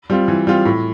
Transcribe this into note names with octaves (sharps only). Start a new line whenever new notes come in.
G3 C4 F4
E3
G3 C4 F4
A2